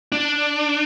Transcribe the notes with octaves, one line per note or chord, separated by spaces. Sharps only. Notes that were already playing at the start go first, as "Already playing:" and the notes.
D4